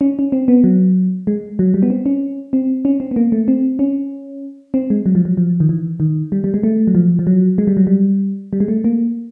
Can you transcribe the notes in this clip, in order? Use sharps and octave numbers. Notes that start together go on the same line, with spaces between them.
C#4
C#4
C4
B3
F#3
G#3
F#3
G3
B3
C4
C#4
C4
C#4
C4
B3
A#3
A3
C4
C#4
C4
G#3
F#3
F3
F#3
F3
D#3
E3
D#3
G3
G3
G#3
A3
F#3
F3
F3
F#3
G#3
G3
F#3
G3
G3
G#3
A3
A#3